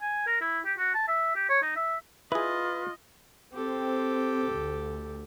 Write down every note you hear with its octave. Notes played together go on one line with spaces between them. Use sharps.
G#5
A#4
E4
G4
F#4
A5
E5
G4
C#5
D#4
E5
E4 F4 G#4 B4 D#5
C4 G4 A4
D2